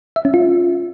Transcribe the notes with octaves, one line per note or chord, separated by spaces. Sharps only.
E5
C#4
F4